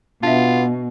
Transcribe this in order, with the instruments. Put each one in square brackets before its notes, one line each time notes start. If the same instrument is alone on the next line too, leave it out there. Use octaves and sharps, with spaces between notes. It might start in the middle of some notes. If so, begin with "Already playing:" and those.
[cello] B2 [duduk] B3 [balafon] D4 E5 [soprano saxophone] F4